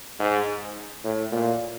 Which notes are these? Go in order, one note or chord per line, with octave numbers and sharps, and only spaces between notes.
G#2
A2
A#2